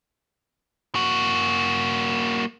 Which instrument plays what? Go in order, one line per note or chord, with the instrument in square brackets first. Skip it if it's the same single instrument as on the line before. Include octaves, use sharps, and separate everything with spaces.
[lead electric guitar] A#3 F#4